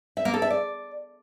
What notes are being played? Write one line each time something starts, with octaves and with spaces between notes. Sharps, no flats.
E5
A#3
A4
E5
D5